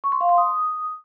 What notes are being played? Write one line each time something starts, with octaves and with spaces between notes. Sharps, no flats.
C#6
C6
F5
C6
D#6